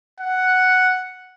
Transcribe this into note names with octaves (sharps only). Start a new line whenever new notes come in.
F#5